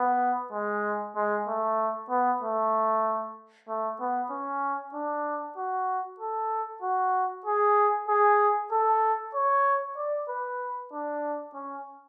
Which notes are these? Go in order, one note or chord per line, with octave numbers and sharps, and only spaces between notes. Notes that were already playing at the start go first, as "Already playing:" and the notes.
Already playing: B3
G#3
G#3
A3
B3
A3
A3
B3
C#4
D4
F#4
A4
F#4
G#4
G#4
A4
C#5
D5
B4
D4
C#4